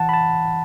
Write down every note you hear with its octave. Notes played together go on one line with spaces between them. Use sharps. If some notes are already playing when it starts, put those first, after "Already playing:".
Already playing: E3 F#5 A5
B5
A5